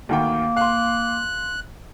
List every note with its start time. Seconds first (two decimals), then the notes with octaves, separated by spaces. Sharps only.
0.09 D2 D#3 A#3 G5
0.57 F5 C6 F#6